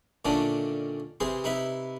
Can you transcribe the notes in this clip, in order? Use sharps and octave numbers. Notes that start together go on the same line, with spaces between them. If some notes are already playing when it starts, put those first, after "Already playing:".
A#2 D3 D#3 A3 C#4 D4
C3 E3 G#4 C5
C3 D#4 E4 B4 E5